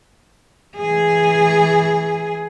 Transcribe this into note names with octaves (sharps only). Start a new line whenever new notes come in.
E3 G#4